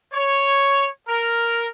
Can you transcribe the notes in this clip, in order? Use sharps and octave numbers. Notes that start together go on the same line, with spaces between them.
C#5
A#4